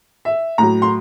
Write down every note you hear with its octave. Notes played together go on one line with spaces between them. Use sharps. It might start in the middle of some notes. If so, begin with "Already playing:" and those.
E5
A2 F#3 A#5
C6